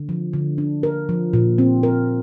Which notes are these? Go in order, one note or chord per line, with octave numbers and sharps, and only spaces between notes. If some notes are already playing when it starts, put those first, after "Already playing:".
Already playing: D3
F3
D3
D4
A#4
F3
A#2
C4
A#4